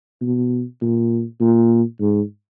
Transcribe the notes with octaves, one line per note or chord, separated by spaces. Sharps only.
B2
A#2
A#2
G#2